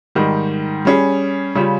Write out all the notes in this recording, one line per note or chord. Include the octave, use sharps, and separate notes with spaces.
G#2 D#3 G3
G3 C#4 G#4
C#3 G3 C#4 F4